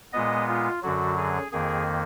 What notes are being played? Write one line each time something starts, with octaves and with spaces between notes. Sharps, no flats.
A#2 G#3 B3 D#5
F4
F#2 D3 F#3 F#4
G#4
F2 D#3 A#3 G#4